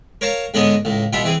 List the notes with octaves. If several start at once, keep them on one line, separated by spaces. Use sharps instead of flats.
A#4 C#5 F5 A5 A#5
G#2 D3 G#3 B3 C#4 D#5
C#2 A2
C2 B2 B3 F4 E5 B5
E3 C4 G#4